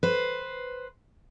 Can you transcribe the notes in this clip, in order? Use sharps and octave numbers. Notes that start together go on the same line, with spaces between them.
B4 C5